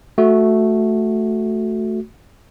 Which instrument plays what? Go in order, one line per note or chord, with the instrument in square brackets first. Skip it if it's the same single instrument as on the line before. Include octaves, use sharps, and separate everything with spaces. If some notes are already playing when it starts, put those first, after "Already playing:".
[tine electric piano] A3 F#4